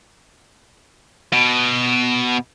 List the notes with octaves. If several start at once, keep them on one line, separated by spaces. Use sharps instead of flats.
B2